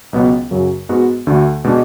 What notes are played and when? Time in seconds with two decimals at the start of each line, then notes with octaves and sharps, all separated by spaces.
0.13 C#2 B2 F#3 B3
0.51 F#2 C#3 F#3
0.89 G#2 G#3 B3 F#4
1.27 D2 D3 A3 D4 F#4
1.64 B2 G#3 D4